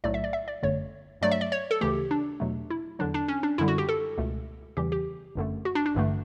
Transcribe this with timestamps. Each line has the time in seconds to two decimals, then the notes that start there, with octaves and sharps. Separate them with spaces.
0.04 B1 A2 F#3 A3 D5
0.14 E5
0.24 D5
0.33 E5
0.48 D5
0.63 G1 F#2 D3 A3 C#5
1.21 G2 F#3 A3 D5
1.31 E5
1.41 D5
1.52 C#5
1.71 A4
1.81 D2 C#3 E3 A3 G4
2.11 D4
2.40 E2 B2 F#3 A3
2.70 E4
2.99 E2 D3 F#3 D4
3.14 D4
3.28 C#4
3.43 D4
3.58 F#2 D3 G3 E4
3.68 F#4
3.78 G4
3.89 A4
4.17 C#2 B2 A3
4.77 E2 C#3 E3 G3 G4
4.92 G4
5.35 G1 F#2 D3 A3
5.65 F#4
5.75 D4
5.86 D4
5.95 A1 G2 D3 A3